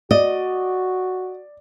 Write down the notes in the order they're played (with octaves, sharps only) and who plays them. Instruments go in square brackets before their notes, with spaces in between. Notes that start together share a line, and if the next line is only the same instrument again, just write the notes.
[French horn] F#4 [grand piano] D5 [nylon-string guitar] D#5